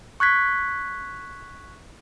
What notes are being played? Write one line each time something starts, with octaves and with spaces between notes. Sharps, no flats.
C#6 F#6 G#6 B6